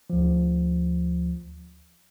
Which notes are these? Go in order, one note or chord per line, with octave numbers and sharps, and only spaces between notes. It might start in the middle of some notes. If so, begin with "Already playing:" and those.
D2 F3